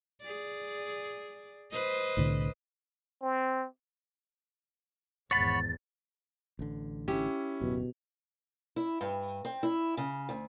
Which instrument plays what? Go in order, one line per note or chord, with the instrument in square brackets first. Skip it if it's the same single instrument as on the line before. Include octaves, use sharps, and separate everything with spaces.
[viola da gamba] G#4 D5
B4 C5 D#5
[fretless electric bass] C2 A2 D3
[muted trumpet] C4
[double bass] G#1 E2 [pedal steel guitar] C#5 F#5 B5 [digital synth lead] A6
[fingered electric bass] A1 D3
[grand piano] C#4 E4 [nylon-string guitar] G4
[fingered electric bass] D1 F#2 [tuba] B2
[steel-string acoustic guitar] E4
G2
C4
E4
C#3
D2